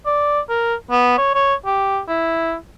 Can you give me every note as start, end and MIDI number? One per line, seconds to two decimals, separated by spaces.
0.06 0.40 74
0.49 0.75 70
0.91 1.16 59
1.18 1.34 73
1.35 1.54 73
1.66 2.00 67
2.08 2.55 64